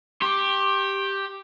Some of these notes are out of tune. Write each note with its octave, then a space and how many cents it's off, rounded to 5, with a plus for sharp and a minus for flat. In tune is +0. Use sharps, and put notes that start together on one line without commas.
G4 +0 C6 +45